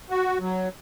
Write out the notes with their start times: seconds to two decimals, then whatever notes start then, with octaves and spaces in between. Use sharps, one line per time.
0.10 F#4
0.40 F#3